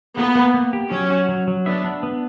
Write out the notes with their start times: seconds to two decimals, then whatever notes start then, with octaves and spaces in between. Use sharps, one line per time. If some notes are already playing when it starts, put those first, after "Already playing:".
0.17 A#3 B3
0.35 A#3
0.54 A#3
0.73 G4
0.91 F#3 C#4
1.10 F#4
1.29 F#3
1.47 F#3
1.66 B3 D4 E5
1.84 D4
2.03 B3